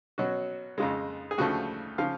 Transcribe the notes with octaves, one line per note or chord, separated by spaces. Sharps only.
B2 F#3 C#4 F#4
F2 C#3 G#3 F4
G#4
D2 C#3 F3 A3 F#4
C#3 F3 F5